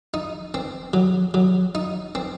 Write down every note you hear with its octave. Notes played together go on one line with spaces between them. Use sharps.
D#4
C4
F#3
F#3
D#4
C4